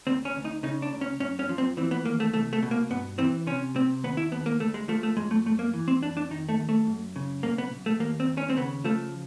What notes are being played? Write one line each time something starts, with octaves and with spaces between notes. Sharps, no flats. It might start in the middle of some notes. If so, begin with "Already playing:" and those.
D2 C4
C#4
D2
D#4
C#3 D#4
D4
C#2
C#4
F#2 C#4
C#4
F3
C4
E3 C4
B3
D#2 A#3
A3
C2 A3
A3
B2
A#3
G2 B3
E3 C4
C3 C#4
C3 C4
D#2 B3
E4
D#2 B3
A#3
D2 A3
G#3
F3 A3
A3
F#2 G#3
A3
F#2 A3
A#3
E3
C4
F2 D4
D4
D#3 D#4
A3
D#2
A3
F#2
C#3
B1 A#3
B3
B1
A3
D#2 A#3
C4
D#2
C#4
C4
C#3 B3
F3 A3